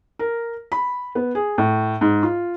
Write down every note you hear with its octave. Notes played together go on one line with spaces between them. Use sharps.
A#4
B5
B3
G#4
A2
G#2
F4